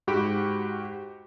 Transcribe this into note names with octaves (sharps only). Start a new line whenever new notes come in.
G#2 F#4 G4 B5 D7